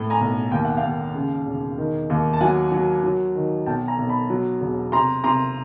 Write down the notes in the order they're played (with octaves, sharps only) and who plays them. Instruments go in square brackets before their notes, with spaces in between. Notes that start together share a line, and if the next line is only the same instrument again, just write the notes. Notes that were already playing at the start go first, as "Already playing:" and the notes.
Already playing: [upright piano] A2
G#5 A#5
B1
D#2 G5
F#5
F5 G5
D#2
C#3
E1
D#3
D#2
A5
F#3 F#5 G#5
F#3
F#3
D#3
B1 G5 A5
G#5 A#5
B1
A5 B5
F#3
E1
C3 A#5 C6
C3 A#5 C6